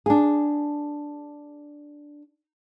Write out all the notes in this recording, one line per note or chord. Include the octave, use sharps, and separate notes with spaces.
D4 G#4